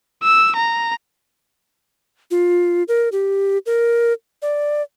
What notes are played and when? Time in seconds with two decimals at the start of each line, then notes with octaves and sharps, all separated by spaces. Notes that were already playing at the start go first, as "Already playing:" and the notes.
0.23 E6
0.56 A#5
2.31 F4
2.88 A#4
3.12 G4
3.66 A#4
4.42 D5